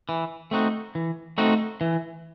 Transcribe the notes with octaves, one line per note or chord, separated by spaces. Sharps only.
E3
A3 C4 D#4 F#4
E3
A3 C4 D#4 F#4
E3